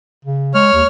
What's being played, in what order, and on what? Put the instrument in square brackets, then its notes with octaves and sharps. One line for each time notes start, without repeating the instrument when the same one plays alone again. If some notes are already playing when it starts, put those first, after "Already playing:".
[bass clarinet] C#3
[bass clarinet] G#3 [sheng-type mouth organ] C#5 F6
[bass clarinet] D#2